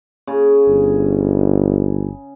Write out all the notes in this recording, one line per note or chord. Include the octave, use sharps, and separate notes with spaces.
C#3
G1